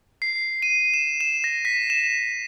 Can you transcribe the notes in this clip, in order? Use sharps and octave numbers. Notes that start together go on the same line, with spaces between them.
C7
D#7
E7
E7
A#6
B6
E7